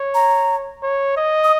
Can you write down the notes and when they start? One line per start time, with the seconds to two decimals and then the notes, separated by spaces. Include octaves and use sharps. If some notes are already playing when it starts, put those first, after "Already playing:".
Already playing: C#5
0.15 A#5
0.82 C#5
1.17 D#5
1.44 D#6